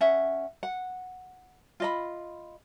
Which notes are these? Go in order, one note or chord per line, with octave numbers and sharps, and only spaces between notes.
C#4 E5 F#5
F#5
F4 D#5 B5